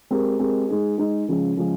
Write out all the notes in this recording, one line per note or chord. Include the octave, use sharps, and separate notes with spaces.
G#3 C4 G4 A#4
G#3 C4 G4 A#4
G#3 D#4 G#4
G#3 D#4 G#4
C#3 F3 G#3 C#4
C#3 F3 G#3 C#4